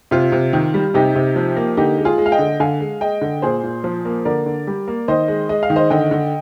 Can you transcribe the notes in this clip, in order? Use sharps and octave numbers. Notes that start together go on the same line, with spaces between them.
C3 F4
C3
D#3
G3
C3 D#4 G4
C3
F3
A#3
D3 D#4 G4
G#3
F4 G#4
G#3
F5
D#5 G5
D3
D3 F5 G#5
G#3
G#3 D#5 G5
D3
A#2 G#4 C5
A#2
F3
A#3
D3 A#4 D5
D3
G3
A#3
D#3 C5 D#5
G#3
G#3 D#5
F5
D#3
C5 D#5
D3 D#5 G5
D3